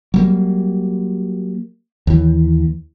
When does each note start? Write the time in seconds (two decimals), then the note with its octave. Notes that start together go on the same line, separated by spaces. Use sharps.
0.14 F#3 G3 A#3
2.07 D#2 E3